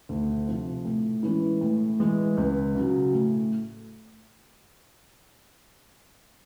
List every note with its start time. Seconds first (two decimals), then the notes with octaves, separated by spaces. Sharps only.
0.09 D2
0.47 C3 F3
0.85 A2
1.23 E3 G#3 C#4 E4
1.61 A2
1.99 E3 G#3
2.37 C#2
2.75 C#3 F#3
3.13 A2